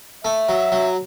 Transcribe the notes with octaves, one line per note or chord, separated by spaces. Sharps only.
A3 E5
F#3
F#3